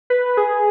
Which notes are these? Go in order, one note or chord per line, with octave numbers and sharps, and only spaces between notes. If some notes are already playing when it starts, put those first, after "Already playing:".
B4
G#4